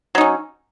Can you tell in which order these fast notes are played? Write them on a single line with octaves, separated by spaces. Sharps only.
F#3 D#4 C#4